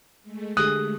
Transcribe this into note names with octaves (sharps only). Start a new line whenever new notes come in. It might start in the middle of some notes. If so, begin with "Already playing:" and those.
G#3 A3
D3 G4 G#4 D#6 F#6